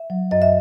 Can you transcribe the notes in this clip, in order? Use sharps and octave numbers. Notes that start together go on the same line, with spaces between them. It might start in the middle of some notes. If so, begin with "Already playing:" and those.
Already playing: E5
F#3
F#2 D#5
E5